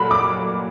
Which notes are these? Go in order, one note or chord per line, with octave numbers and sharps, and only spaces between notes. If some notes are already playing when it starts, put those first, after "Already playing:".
Already playing: A#2 F#3 A3 B5
D6